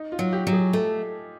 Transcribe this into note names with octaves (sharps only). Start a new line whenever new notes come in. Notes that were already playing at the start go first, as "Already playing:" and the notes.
Already playing: D#4
F4
F#3
G4
F#3
G#4
A3 A4